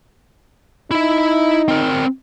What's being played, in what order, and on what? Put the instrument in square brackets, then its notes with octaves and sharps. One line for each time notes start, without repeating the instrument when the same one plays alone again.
[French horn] D#4 [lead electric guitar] E4 E5
[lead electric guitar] C4 A#4